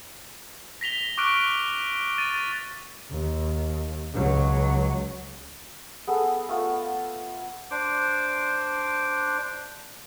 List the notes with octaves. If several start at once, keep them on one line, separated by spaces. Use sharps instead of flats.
A#6 B6 F7 G7
C#6 D6 F6 F#6 D7
A6 D#7
D#2
C#2 F#3
B3 G#4 A4
A3 B3 F4
D4 C5 D6